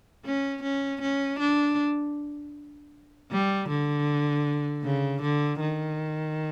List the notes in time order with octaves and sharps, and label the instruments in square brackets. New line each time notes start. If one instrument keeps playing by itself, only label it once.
[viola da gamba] C#4
C#4
C#4
D4
G3
D3
C#3
D3
D#3